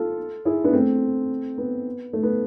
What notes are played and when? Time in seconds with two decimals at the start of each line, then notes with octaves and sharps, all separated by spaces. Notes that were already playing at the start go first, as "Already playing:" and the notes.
Already playing: F4 A4
0.45 E4 G#4
0.64 B3 D4
0.73 A3 C4
1.58 B3
2.13 A3
2.23 B3